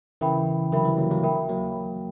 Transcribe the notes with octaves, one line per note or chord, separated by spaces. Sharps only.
C#3 E3 A#4 E5 G5 B5
D3 F#3 A#4 E5 G5 B5
E3 G3
F#3 A#3
F#3 A#3
A#4 E5 G5 B5
F#3 A#3